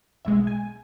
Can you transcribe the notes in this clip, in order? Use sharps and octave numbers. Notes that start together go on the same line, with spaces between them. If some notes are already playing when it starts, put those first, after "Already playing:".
B1 B2 G#3 E5
G#5